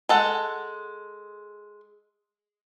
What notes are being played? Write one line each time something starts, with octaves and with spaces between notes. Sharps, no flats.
G#3 A4 F#5